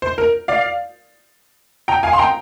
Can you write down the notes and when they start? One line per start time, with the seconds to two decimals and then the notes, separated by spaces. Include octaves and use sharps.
0.02 C5
0.18 A#4
0.48 D5 F5
1.88 G5 A#5
2.03 F5 G#5
2.13 C6
2.19 G5 A#5